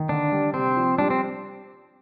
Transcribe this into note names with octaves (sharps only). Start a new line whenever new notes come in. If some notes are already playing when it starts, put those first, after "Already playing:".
Already playing: D#3
D3 D4
G3
C3 C4
F3
G3 D4
C4